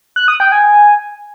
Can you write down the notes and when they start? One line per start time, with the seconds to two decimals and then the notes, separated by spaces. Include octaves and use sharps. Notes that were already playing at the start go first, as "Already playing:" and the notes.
0.16 F#6
0.28 D#6
0.40 G5
0.52 G#5